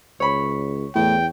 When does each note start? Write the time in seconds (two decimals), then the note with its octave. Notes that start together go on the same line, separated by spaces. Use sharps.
0.20 C#2 C#5 B5
0.95 E2 A2 G5